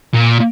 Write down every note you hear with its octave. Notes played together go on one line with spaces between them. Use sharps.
A#2